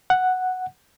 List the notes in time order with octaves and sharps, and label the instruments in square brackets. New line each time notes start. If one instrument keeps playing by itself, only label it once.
[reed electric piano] F#5